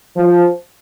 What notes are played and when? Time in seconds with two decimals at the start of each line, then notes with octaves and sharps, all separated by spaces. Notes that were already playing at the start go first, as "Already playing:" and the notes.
0.17 F3